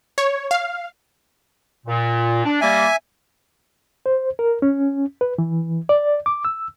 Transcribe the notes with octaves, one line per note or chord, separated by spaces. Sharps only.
C#5
F5
A#2
D4
G3 A#3 E5 G#5
C5
A#4
C#4
B4
E3
D5
D6
E6